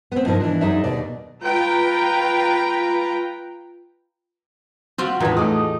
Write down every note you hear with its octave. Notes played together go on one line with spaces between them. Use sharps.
B3 C4
G2 B2 F3 D#4 A#4
E3 D4
F#2 F#3 D#4 G#4 D5 E5
D#2 B2 D5
F4 B4 G5 A#5
G3 C4 F4 F#4
E2 A2 D#3 D4 F4 G#4 B4 A#5
A3 D#4 F4 G#4 D6 D#6